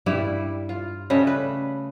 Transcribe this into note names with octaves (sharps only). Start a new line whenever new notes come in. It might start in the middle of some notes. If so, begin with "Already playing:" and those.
G2 G3 E4 D5
F4
C#3 G3 A3 D#5
B4